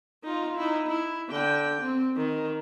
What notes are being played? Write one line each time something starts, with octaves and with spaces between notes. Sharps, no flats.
D#4 F4
D#4 E4
E4
D3 G5
C4
D#3